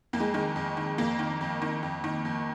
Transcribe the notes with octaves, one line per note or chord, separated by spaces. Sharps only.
F2 A#3
G#3
D#3 G#3
F2
D#3
F2 A#3
D#3
F2
D#3
F2
D#3
F2